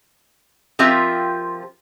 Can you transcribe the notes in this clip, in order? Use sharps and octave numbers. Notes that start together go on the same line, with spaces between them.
F3 C4 F4 G4 A#4 E5